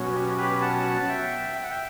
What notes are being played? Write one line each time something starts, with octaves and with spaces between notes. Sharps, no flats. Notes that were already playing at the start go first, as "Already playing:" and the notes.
Already playing: B2 F#3 C#4
G4
G4 B4
F#5 A5
E5 G5
G5
F#5
E5 G5